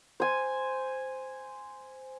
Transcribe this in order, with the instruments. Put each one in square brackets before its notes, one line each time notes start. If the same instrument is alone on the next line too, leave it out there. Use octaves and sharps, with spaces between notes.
[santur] C5 G#5